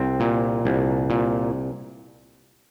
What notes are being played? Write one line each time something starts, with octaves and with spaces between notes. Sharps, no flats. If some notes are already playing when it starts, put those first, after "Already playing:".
Already playing: C2 C4
A#2
C2
A#2